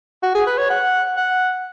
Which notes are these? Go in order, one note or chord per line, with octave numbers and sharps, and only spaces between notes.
F#4
G#4
B4
C#5
F#5
F#5